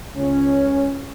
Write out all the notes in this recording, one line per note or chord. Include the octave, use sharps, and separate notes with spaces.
C#2 C#4